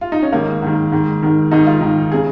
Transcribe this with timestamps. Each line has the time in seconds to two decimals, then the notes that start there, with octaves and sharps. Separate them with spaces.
0.01 F4
0.12 D#4
0.23 C#4
0.32 G#2 D#3 A#3
0.62 G#2 D#3
0.92 G#2 D#3
1.23 G#2 D#3
1.51 G#2 D#3 D#4
1.67 F4
1.81 G#2 D#3
2.12 C#3 G#4